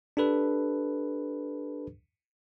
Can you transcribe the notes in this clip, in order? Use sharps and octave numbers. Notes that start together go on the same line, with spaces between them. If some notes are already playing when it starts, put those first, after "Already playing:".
D4 G4 A4 B4